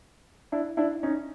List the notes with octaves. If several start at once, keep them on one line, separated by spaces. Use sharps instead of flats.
D4 E4
D4 E4
C#4 D#4